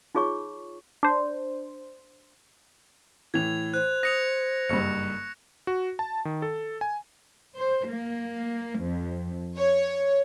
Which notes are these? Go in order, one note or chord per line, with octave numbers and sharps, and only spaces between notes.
D#4 F4 G#4 C#5 C#6
D4 C5
A2 E3 G#6 F7
C5 F#6
D#6 A#6 C#7 F7
F#1 G2 C#6 C#7
F#4
A5
D#3
A4
G#5
C5
A#3
F2
C#5